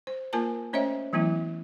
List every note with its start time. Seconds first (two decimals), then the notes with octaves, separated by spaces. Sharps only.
0.07 C5
0.33 A#3 F4 A#4 G#5 A5
0.73 A3 C#4 C5 C#5 D#5 E5
1.13 E3 F#3 A3 B3 E4